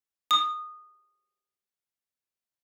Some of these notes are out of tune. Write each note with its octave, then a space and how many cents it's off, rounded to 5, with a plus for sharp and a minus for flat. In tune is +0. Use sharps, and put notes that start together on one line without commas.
D#6 -20